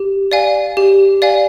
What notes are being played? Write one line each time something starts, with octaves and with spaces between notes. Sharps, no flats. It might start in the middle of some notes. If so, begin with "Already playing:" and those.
Already playing: G4
D5 F5 G#5
G4
D5 F5 G#5